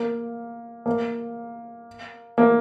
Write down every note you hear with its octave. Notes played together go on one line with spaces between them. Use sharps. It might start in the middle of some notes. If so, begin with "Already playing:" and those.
Already playing: A#3
A#3
A#3